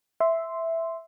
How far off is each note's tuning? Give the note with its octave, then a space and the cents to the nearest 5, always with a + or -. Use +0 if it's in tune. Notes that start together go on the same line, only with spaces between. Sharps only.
E5 +0 C6 -5